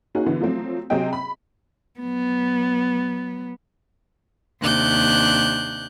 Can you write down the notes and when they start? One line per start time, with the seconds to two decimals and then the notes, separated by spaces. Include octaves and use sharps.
0.15 A#3 C#4 D#4 F#4 G#4
0.26 D3 E3 B3
0.41 F3 F#3 A3 C4
0.90 C3 F#3 C4 G#4 D#5 G5
1.13 B5
2.00 F#3 B3
4.61 D#2 C3 D4 F#6 G6